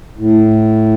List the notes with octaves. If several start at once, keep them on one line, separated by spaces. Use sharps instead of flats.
A2